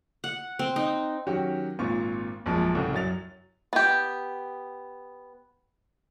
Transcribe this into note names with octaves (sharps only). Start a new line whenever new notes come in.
F#5
C4
D#4
D#3 F#3 C#4 F#4 G4
G#1 A#2 C4 F4 C#6
A#1 F#2 A#2 F3 G#3
C2 A2 C#3 E3 A3
F#2 F#3 A6 F7
B3 G4